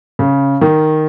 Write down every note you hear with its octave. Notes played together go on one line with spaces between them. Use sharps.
C#3
D#3